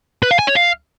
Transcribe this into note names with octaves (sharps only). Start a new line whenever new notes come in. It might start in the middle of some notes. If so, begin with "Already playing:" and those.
B4
F5
G#5
C#5
F5